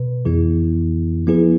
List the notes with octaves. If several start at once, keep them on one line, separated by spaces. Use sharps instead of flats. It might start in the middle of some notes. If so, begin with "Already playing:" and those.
Already playing: B2 B4
F2 E3 B3 E4 G#4
F3 B3 E4 G#4 B4